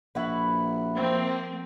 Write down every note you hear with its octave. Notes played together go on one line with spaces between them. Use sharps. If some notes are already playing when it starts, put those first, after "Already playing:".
A#1 E4 F#4 B4
F3 A#3 C4